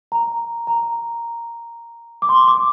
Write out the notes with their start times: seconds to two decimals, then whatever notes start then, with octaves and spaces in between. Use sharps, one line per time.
0.12 A#5
0.67 A#5
2.22 D6
2.29 C6
2.48 D6